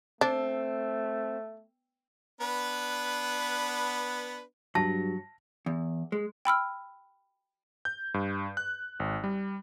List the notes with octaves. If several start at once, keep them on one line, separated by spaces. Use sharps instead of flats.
A3 C4 D4
B3 D4 B4
G2 F#3 A5 A#6
E2
G#3
G5 B5 E6 F6
G6
G2
F#6
G#1
G3